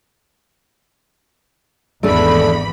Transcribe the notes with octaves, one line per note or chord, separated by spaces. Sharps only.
G#1 E2 A3 D4 G#4 D5 B5